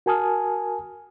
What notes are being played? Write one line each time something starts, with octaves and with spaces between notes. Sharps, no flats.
F#4 A#4 G#5 A5 D#6 F6